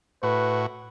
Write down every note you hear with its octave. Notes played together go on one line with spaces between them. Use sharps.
A2 F#4 B4